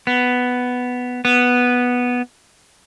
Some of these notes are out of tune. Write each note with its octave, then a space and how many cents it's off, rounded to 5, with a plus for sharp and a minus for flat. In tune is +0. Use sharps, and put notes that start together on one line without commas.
B3 +5
B3 -5